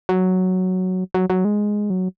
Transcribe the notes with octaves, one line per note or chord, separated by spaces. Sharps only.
F#3
F#3
F#3
G#3
F#3